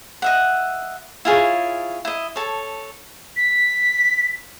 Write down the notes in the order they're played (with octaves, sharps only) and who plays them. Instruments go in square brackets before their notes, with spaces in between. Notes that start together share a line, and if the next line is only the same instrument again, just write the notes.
[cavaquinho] D#5 E5 F#5
E4 F4 G#4 C#5
E4 D#5
A4 C#5
[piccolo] B6